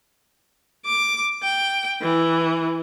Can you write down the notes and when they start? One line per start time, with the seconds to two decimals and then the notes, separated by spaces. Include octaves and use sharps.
0.86 D6
1.43 G5
2.02 E3